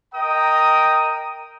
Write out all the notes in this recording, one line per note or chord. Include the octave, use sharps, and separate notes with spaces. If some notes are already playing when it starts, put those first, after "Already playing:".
A#4 D#5 G5 A#5 D#6